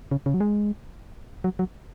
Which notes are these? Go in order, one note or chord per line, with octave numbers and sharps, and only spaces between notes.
C#3
C#3
F#3
G#3
F#3
F#3